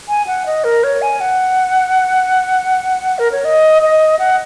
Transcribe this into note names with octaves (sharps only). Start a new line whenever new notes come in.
G#5
F#5
D#5
A#4
C#5
G#5
F#5
A#4
C#5
D#5
D#5
F#5